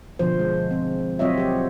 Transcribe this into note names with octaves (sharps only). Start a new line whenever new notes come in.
B2 D3 F3 C5
G#3
C4
F#3 C4 F4 C#5 D#5 E5
G4 C5